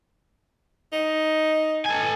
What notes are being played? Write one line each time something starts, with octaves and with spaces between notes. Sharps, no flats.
D#4
A4 G#5